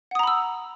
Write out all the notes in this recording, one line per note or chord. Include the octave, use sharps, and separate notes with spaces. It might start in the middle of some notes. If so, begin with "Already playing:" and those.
F#5 A#5 B5 D#6 E6